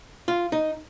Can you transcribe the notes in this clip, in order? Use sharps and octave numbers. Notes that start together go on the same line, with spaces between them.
F4
D#4